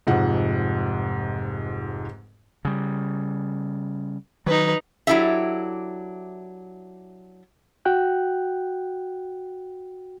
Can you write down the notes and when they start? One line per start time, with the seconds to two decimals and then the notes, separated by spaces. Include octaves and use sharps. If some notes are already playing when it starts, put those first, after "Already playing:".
0.07 F1 G#2 F3 F#5
2.65 C#3 G3
4.46 D#3 F#3 D#4 B4
5.07 F#3 D4 E4 G4 A4 E5
7.85 F#4 G5 F#6